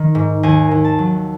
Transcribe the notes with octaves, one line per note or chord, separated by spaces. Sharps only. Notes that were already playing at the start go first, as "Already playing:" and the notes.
Already playing: D#3
G#2
D#2 G#5
D#2
A5
F#3